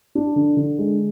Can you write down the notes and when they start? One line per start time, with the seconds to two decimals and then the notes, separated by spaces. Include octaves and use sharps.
0.15 D4
0.36 D3
0.57 D3
0.78 G#3